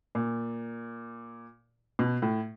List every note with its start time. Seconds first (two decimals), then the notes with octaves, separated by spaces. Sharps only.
0.15 A#2
1.99 B2
2.22 A2